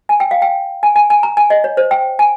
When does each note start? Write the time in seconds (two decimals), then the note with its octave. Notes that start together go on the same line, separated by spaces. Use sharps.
0.09 G#5
0.20 G5
0.31 F5
0.42 G5
0.83 G#5
0.96 G#5
1.10 G#5
1.23 A#5
1.37 G#5
1.50 D#5
1.64 C#5
1.77 C5
1.91 G5
2.19 G#5